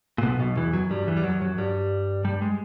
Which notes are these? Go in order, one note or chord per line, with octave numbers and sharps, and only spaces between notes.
A#2
B1 B2
B1 B2
E2 E3
F#2 F#3
G2 G3
E2 E3
G3
F#2 F#3
F#2 F#3
G2 G3
G2 G3
G#3